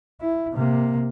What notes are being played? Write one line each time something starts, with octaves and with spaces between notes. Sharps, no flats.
E4
C3 A#3